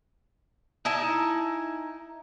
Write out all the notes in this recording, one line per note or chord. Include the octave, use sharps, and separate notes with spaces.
D#4 E4 G#5 A5